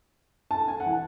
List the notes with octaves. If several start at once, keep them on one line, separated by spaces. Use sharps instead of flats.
A5
G#5
F#5
E3